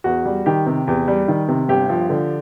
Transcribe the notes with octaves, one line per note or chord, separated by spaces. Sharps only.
E2 F#4
G3
D#3 G4
C3
E2 G4
G3
D#3
C3
G1 G4
F3
D3